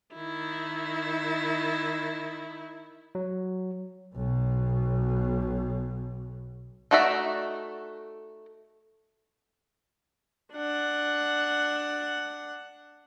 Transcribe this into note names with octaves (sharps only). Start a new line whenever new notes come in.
D#3 E4
F#3
B1 B2
A3 D#4 F#4 D5 E5
D4 F#5